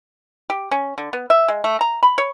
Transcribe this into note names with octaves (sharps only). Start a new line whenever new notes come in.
G4
C#4
D3
B3
E5
G#3
A3
A#5
B5
C#5